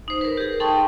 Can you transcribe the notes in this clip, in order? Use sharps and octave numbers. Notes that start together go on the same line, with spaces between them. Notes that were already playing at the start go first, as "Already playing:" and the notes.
D#4 C5
A#4 B4
G4 G#4
D#4 A4 G5 A5 C6 C#6